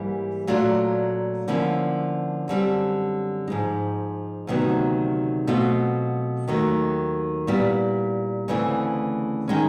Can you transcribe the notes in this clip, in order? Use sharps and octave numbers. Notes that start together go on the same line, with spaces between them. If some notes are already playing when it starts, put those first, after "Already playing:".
Already playing: G#2 E3 G3 A#3
A#2 F#3 A3 D4 F4
D3 F3 A#3 C#4 E4
F#2 D3 G3 C4
G#2 F3 G#3
D2 C3 D#3 F#3 B3
B2 F#3 A3 C4 F4
D#2 D#3 F#3 A3
A#2 G3 B3 E4
D2 C#3 E3 A3 C4
D#3 G#3 C#4